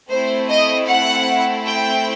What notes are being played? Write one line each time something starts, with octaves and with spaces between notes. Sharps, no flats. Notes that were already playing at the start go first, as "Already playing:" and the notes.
A3 C4 E4 C5
D#5
F#5
G5